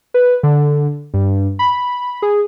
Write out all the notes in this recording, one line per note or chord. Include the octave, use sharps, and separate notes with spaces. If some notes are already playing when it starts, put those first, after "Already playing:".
B4
D3
G2
B5
G#4